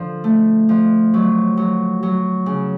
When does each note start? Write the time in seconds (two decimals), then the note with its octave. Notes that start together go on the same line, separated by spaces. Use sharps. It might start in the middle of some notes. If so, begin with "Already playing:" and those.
Already playing: D3 F3
0.24 A3
0.69 F3
1.14 F#3
1.57 F#3
2.03 F#3
2.46 C#3